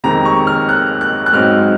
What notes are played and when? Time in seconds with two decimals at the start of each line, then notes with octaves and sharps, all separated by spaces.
0.04 F2 C3 D#3 G#3 C4 A#5
0.25 C#6
0.47 F6
0.69 F#6
1.01 F#6
1.26 F#6
1.33 G#2 F#3 C4 D#4 F6